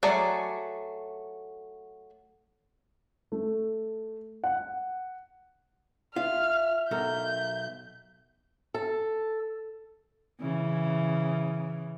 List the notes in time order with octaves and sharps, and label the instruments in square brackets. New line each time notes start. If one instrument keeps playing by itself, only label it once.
[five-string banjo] F#3 A3 G#4 D5
[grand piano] A3
F#5
[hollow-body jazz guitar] F4 [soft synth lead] E5 [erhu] F6
[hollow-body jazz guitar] B1 A4 A#4 [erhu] G6
[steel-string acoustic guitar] A4
[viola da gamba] C#3 E3